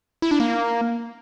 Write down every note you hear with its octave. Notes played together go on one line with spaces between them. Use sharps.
E4
D4
A#3